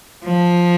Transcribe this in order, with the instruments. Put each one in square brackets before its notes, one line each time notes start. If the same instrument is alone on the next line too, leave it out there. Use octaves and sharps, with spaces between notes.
[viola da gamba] F3